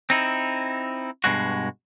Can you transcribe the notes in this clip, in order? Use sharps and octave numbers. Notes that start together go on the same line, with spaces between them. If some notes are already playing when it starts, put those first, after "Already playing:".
C4 D#4 E4
G2 B2 G#3 F#4